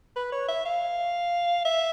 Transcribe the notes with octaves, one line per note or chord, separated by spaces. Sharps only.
B4
C#5
E5
F5
E5